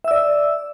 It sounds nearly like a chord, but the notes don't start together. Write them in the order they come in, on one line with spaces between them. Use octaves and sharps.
E5 E6 D5